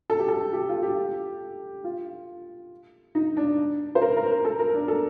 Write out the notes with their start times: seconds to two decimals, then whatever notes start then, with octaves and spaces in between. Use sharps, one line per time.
0.10 A4
0.19 G4
0.28 A4
0.53 G4
0.69 F4
0.83 G4
1.84 F4
3.15 D#4
3.37 D4
3.95 C5
4.02 A#4
4.17 A#4
4.31 A#4
4.45 A4
4.59 A#4
4.74 D4
4.88 A4